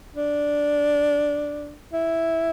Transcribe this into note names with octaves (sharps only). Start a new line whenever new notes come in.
D4
E4